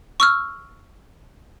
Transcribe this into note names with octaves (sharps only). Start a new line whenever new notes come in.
C#6 E6 F6